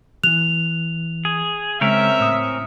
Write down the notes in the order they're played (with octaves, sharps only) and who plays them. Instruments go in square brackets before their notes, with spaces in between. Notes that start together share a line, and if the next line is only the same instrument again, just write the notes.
[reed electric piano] E3 F#6 [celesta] F7
[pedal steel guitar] G#4
[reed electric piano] C#3 G#3 [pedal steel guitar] C4 C#4 A#4 [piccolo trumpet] E5
[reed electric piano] A2 D#6